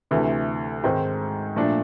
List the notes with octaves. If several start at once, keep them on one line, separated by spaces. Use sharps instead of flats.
D2 C3 E3 A3
G#2 D#3 G#3 C4
A#2 F3 A3 D4